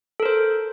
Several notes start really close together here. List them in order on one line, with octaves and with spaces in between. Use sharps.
A4 A#4 C5